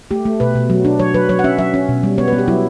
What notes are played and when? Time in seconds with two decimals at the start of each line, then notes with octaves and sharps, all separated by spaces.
0.11 A3 G4
0.25 A3
0.40 B2 B4
0.55 B2
0.70 F#3
0.85 D4
1.00 F#3 C#5
1.14 F#3 B4
1.29 F#3 C#5
1.39 F#5
1.44 C#4 E5
1.58 F#3 E5
1.74 C#4
1.89 B2
2.03 G3
2.18 B3 C#5
2.28 B4
2.33 B3
2.38 G4
2.48 F#3 E4